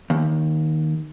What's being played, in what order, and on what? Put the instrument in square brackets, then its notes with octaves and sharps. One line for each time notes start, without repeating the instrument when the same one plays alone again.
[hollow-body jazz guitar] D#2